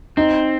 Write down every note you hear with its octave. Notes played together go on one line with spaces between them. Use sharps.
C4 D#4